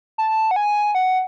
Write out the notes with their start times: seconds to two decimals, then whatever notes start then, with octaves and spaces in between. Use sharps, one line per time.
0.18 A5
0.51 F#5
0.56 G#5
0.95 F#5